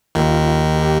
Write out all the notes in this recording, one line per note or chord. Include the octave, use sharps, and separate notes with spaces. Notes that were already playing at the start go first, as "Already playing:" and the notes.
D#2 D#3 F4
G4